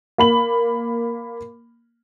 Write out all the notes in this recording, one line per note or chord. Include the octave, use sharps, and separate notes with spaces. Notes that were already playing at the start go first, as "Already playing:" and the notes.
A#3 B5 F#7